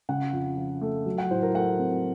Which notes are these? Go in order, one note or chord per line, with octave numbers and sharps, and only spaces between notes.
C#3 F#5
F2
F3
A3
F#3
F#5
A2 C5
A#4
A3 F#5
C4